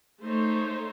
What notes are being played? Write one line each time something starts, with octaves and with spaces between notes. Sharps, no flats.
A3 D#4 A4 C5 C#5